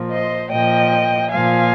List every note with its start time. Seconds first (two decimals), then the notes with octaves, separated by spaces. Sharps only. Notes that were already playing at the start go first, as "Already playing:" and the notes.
Already playing: A#2 F3
0.11 C5 D#5
0.51 A#2 F3 D#5 G5
1.31 A#2 F3 F5 G#5